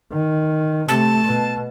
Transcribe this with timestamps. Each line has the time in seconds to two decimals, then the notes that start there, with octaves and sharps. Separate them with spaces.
0.12 D#3
0.88 C3 A3 A5
1.24 B2